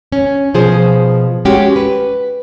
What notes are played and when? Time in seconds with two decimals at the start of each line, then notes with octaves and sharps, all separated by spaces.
0.12 C#4
0.54 B2 F3 G#4 C5
1.45 G#3 C#4 F#4 G4
1.76 B4